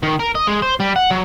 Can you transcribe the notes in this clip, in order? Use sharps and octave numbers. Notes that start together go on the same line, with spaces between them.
D#3
A#4
D#5
G#3
C5
G3
F#5
F#3